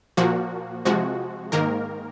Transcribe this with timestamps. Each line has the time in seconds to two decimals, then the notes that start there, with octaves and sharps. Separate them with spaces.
0.17 A#2 F3 A#3 F#4
0.85 C3 F3 G#3 F#4
1.52 G#2 D#3 A#3 A#4